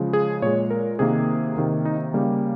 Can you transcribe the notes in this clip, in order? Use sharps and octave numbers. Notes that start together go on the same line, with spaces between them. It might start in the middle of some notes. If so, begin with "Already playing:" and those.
Already playing: C#3 F3 G#3
G#4
A#2 G#3 C#5
A#4
C3 D#3 A#3 G#4
C3 D#3 A#3
D#4
C#3 G3 A#3